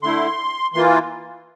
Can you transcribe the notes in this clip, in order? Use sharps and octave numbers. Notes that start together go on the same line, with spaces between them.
D3 A3 E4 C6
E3 A#3 F4 C6